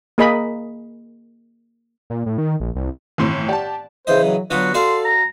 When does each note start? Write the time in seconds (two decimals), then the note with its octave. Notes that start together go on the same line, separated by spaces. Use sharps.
0.18 A#3 G#4 D#5 B5
2.10 A#2
2.26 A2
2.38 D#3
2.60 A#1
2.76 C2
3.18 G1 A2 D#3 E3 C4 C6
3.49 G4 D5 F#5 A5
4.07 C#3 E3 C5 D#5
4.24 F#3
4.50 D3 F#3 B3 F4 F#4
4.74 F#4 A4 D5 F5 C6
5.05 A#5